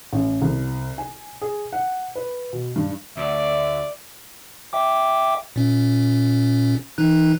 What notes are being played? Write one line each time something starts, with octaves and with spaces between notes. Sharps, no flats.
A1
C2
G#5
G#4
F#5
B4
B2
G2
D2 D5 E5
E5 G5 D6
A#2 C#4
E3 D#4 F#6